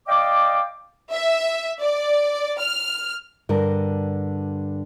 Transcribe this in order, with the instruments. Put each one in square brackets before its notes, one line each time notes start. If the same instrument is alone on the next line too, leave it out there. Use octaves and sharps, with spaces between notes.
[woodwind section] D5 D#5 F5 G5 D6
[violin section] E5
D5
F6
[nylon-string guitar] G2 D3 A#4